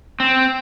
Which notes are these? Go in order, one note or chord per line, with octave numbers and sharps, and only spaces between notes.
C4